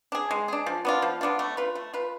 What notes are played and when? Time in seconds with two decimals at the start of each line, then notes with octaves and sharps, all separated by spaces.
0.12 D4 G#4
0.31 G#3
0.48 D4 G#4
0.66 F3
0.85 B3 D4 F4
1.02 F3
1.21 B3 D4 F4
1.39 A3
1.57 F4 B4
1.75 A3
1.93 F4 B4